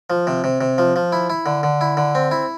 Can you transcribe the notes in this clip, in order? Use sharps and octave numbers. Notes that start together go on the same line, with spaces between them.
F3
C3
C3
C3
F3
F3
E4
E4
D3
D3
E4
D3
C4
E4